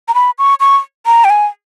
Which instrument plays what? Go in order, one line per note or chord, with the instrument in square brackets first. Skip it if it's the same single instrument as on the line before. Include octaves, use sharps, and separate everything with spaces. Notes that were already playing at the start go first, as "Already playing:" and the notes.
[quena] A#5
B5
C#6
C#6
A#5
G5
G#5